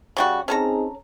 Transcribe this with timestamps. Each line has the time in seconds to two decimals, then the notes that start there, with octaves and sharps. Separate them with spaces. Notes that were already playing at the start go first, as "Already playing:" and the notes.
0.17 C#3 G3 F#4
0.48 C4 C#4 D#4 G#4 A4 A#5